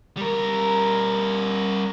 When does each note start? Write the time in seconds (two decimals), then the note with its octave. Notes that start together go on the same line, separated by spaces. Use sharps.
0.17 G3 A#4